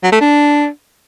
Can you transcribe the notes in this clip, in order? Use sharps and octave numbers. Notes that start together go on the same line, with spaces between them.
F#3
A3
D4